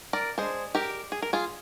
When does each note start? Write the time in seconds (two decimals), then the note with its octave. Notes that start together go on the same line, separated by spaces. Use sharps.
0.13 A#4 D5
0.38 G#3 D4 G#4 C5
0.75 G4 A#4
1.12 G#4
1.22 A#4
1.33 F4 G#4